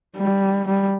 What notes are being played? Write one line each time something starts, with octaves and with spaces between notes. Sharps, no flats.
G3
G3